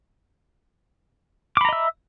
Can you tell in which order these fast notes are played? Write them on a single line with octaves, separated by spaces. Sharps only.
D6 B5 A#5 D#5 E5